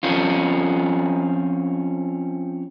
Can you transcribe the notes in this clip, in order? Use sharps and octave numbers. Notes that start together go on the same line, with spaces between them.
F3 C4 C#4 F4